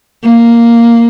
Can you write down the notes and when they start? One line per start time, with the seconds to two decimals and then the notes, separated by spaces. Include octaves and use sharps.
0.23 A#3